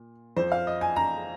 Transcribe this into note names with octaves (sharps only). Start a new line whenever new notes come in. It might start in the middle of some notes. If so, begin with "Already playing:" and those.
Already playing: A#2
F2 F3 C5
F5
D#5
G#5
A#5